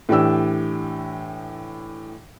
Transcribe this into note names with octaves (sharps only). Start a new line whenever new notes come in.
A2 E3 D4 G4 E6